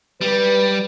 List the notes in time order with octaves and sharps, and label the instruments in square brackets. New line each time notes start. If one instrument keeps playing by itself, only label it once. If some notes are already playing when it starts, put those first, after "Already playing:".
[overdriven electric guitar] G3 [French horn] B4